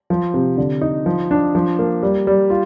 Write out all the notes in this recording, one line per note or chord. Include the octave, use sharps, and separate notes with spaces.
F3
C3
D3
D#4
F3
D4
F3
A#3
G3
G3
F4